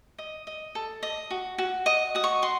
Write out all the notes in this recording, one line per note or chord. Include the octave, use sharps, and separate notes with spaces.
D#5
D#5
A4
D#5
F#4
F#4
D#5 D#6
F#4 D#6
C#6
F#4 C6